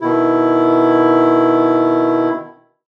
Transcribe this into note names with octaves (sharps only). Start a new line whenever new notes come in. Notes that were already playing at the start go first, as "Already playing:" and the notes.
B2 D#3 E4